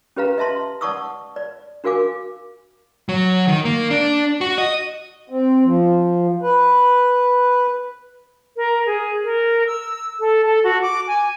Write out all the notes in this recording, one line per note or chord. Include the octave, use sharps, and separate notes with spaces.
C#4 G4 B4 F5 A#5
D#5 E5 A5 C6
D5 F#5 A5 C#6 D#6 E6
D5
D4 F#4 A#4 F5 G#5 D6
F#3
D#3
A#3
D4
F#4
D#5
C4
F3
B4
A#4
G#4
A#4
E6
A4
A4
F#4
D6
G#5